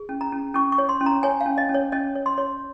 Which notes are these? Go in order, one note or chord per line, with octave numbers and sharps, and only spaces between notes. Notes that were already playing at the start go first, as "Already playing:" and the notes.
Already playing: G#4
C#4
A#5
C#4
C#4 C#6
C#6
C#5
C6
C#4
A#5
C#5 G#5
F5
C#4
D#5
C#4
C#5
C#4 D#5
C#5
C6
C#5